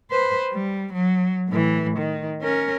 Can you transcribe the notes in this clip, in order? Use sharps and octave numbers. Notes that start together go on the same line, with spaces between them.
B4 C5
G3
F#3
A2 E3
D#3
C#4 A#4